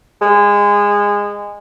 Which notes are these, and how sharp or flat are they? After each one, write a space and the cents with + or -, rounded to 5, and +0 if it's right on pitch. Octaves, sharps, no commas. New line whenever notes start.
G#3 -20